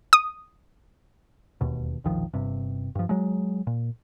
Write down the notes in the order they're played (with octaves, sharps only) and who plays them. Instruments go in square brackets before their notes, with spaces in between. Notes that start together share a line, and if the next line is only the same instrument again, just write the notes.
[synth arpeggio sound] D#6
[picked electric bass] E1 D#2 B2
E1 A#1 D#3 F3
G1 G2 C3
G2 F3
F#3 G#3
A#2